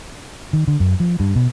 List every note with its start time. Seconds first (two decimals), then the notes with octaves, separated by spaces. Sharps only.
0.53 D#3
0.68 D3
0.80 F#2
1.00 F3
1.20 G2
1.36 B2